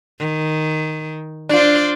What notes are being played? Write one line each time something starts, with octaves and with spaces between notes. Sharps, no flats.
D#3
D4 F4 C5 D5